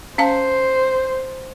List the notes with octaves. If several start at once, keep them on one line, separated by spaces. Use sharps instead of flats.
C#4 C5 F5 A5